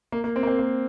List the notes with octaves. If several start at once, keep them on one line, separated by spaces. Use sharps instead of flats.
A#3
A#3
C4
A#3
C4
A#3